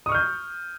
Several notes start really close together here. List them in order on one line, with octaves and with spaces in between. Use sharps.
D#6 C#6 F6 G6